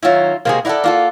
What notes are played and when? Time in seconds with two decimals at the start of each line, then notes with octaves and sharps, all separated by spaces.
0.03 D#3 F#3 C#4 E4 F4
0.45 C3 G#3 A#3 C4 F#4 G#4
0.65 E4 A4 A#4 D5 F#5
0.84 A#3 F4 A4